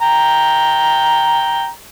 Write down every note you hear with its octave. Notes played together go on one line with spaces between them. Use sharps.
G5 A#5